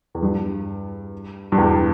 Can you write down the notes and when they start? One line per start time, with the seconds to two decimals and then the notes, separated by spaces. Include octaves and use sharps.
0.15 E2
0.22 G2
1.52 G2
1.58 E2